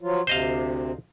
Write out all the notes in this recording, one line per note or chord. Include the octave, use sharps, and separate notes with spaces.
F3 F#3 F4
D2 C3 C5 D#5 F5